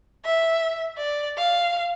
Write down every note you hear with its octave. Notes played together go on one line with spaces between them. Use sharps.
E5
D5
F5